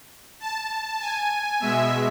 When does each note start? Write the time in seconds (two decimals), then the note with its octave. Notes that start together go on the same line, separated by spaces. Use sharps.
0.40 A5
1.00 G#5
1.60 B2 G#3 E5